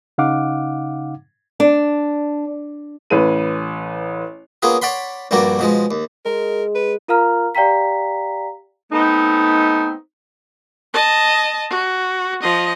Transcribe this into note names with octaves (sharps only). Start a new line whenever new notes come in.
C#3 D#4 F5 F#5 D6
D4
A1 B4 D#7
A#3 B3 C#4 F4 G#4
C#5 D5 F#5 B5 C6
A#1 G2 G3 A#3 D4 F#4
B2 F3 G#3
D#2
G#3 A#4
B4
F4 A#4 F5 A#5 F6
G4 D5 F5 G5 A#5 B6
A3 B3 C4 D#4
D#5 A5
F#4
F3 D#5